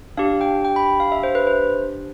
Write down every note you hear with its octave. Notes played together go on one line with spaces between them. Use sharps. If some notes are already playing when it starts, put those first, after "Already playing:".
D4 G4 F5
G5
G5
B5
F5
E5
C5
B4
C5